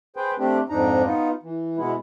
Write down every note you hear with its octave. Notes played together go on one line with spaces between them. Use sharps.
G#4 B4 C5 G5
A3 C4 D4 G4
F2 G#2 D4 D#4 A#5
B3 D#4 F4
E3
B2 G#3 B3 E4